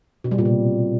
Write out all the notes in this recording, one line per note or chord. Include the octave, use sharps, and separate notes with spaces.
B2
G3
A#2
C3